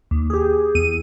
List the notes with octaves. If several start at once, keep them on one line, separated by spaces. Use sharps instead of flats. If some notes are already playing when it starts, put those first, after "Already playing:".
D#2
G4 G#4
E2 D#7